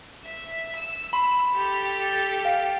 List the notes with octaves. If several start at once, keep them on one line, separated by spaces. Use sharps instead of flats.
E5
E6
B5 C6
G4 A4
A6
F5 G5